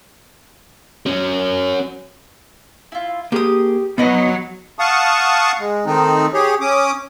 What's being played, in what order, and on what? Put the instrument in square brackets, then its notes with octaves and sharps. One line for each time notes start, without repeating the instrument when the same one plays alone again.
[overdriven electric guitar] F#3 C#4
[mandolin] E4 F4
[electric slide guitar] A#3 G#4 [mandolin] G4 D#6
[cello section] F#3 [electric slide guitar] B3 [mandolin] D#4 B4 D#5
[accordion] F5 F#5 A5 C#6 D#6
G#3
D#3 A3 C4 D#4
G4 G#4 C#5
C#4 D6 D#6